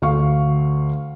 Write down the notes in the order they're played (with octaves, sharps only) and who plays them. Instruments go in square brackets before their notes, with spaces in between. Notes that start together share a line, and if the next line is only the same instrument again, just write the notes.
[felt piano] D2 F5 C#6